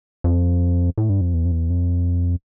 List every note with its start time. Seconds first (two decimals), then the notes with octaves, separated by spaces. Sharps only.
0.24 F2
0.98 A2
1.09 G2
1.21 F2
1.34 E2
1.45 F2
1.52 E2
1.70 F2